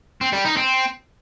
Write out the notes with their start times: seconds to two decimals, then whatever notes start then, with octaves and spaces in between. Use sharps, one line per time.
0.21 C4
0.33 G3
0.45 D#4
0.57 C4